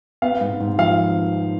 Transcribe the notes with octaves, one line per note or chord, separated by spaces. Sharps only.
B3 F5
G#2
G#2
F3 F5